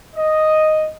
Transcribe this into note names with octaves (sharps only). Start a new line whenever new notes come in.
D#5